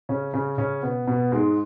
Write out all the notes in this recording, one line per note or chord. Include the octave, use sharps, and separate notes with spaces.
C#3 C#4
C#3 C#4
C#3 C#4
B2 B3
B2 B3
G#2 G#3